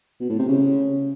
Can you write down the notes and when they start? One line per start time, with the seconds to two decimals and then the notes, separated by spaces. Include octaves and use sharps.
0.20 B2
0.30 A2
0.39 C3
0.49 C#3